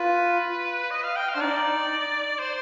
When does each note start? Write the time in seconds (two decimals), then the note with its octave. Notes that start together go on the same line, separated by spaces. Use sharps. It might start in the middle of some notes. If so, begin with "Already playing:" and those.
Already playing: F4 B4
0.91 D#5
1.04 F5
1.16 G5
1.29 F5
1.35 D4 C5
1.41 D#4 D5
2.39 C5